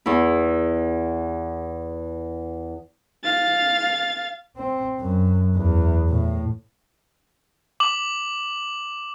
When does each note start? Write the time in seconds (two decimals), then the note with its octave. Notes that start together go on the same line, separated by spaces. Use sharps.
0.06 E2 E4
3.24 F5 A6
4.57 C4
5.00 F#2
5.55 E2
6.09 A2
7.80 D6 F#7